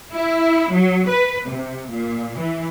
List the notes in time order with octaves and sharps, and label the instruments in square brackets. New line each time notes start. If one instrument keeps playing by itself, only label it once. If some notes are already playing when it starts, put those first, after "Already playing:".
[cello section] E4
F#3
B4
C3
A#2
E3